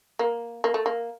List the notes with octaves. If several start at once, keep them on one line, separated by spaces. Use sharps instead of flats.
A#3
A#3
A3
A#3